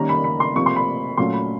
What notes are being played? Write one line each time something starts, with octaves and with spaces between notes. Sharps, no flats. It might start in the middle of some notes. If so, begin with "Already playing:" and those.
Already playing: D#3 G3 A#3 C#4 A#5
B5
B5
C6
C3 F3 A#3 C#6
C6
B5
A#2 F#3 A3 C#4 C6
B5